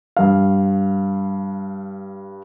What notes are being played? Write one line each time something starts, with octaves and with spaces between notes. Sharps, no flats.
G2 F5